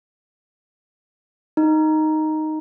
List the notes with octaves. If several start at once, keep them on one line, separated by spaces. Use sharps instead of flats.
D#4